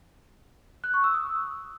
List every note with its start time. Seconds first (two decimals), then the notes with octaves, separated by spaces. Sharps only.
0.84 F#6
0.94 C#6
1.04 E6
1.14 D#6